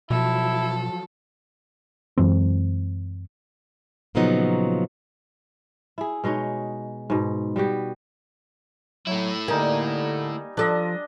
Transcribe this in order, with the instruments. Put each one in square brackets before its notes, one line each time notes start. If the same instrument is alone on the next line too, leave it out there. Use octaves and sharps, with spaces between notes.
[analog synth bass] B2 [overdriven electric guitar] F3 F#3 [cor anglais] E4 [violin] A4
[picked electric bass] F#2 E3 G#3 C4
[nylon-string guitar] A#2 C#3 F3 F#3 B3 D#4
[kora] E4 G#4
B2 G#3 D#4 C#5
G#2 B2
G3 B3 F#4 G4
[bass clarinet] F#3 [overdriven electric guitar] A3 E4
[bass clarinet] D3 [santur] G3 D#4 G#5 [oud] A#3
[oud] F3 A4 [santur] D4 D#5 [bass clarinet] F4